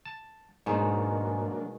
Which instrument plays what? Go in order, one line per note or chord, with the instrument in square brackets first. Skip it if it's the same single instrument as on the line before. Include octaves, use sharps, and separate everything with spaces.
[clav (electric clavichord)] A5
[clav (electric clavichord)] G#2 [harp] B2 D#3 G#3 [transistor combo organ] F#3 A#3 D4